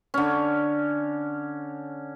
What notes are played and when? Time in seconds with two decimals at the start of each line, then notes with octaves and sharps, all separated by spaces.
0.14 D3 C#4